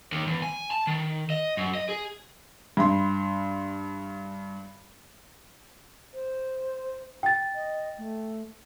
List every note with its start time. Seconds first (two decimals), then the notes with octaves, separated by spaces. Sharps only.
0.12 D#2
0.27 E2
0.42 G#5
0.71 A5
0.87 D#3
1.30 D#5
1.57 F#2
1.75 D#5
1.89 G#4
2.77 G2 C6
6.14 C5
7.23 G5 A6
7.55 D#5
7.98 A3